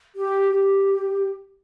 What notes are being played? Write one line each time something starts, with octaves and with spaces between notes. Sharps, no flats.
G4
G4